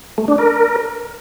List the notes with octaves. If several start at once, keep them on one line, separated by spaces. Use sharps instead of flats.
A3
D4
A#4